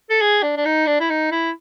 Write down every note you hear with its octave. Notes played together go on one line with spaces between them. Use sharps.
A4
G#4
D4
D4
D#4
D4
E4
D#4
E4